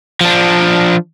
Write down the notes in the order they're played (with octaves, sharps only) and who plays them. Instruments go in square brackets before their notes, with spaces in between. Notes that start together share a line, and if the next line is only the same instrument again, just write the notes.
[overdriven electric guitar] F3 D4